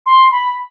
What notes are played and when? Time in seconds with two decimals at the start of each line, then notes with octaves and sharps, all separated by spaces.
0.06 C6
0.31 B5